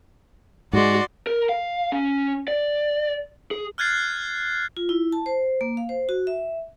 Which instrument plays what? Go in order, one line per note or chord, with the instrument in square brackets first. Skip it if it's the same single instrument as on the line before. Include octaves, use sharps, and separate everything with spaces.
[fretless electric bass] G#2 G#3 [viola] F#4 C6 [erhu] D5
[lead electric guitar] A#4
F5
C#4
D5
G#4
[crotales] F6 F#6 G#6 A6 C7
[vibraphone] F4
E4
A5
C5
A#3
F5
C5
F#4
E5